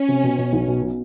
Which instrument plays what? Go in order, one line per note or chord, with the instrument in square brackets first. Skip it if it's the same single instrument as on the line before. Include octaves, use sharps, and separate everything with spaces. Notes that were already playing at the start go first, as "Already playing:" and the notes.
Already playing: [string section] C#4
[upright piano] C3
B2
B2
B1
B2
B2